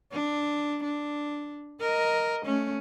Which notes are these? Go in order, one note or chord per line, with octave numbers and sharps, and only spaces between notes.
D4
D4
A#4 D#5
A3 C#4